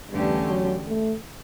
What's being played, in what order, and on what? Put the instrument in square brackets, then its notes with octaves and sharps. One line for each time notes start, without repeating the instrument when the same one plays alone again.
[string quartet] E2 D3 A3 C#4 G4 [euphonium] G2
[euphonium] F#3
A3